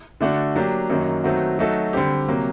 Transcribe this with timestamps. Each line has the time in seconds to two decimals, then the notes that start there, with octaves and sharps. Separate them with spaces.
0.21 D3 A3 D4 F#4
0.56 F#3 A#3 D4 G4
0.90 F#2 D#3 F#3 A#3 D#4
1.24 D#3 F#3 A3 C4 F#4
1.59 F#3 A3 D#4 F#4 A4
1.93 D3 G3 C4 G4
2.28 C3 F#3 A#3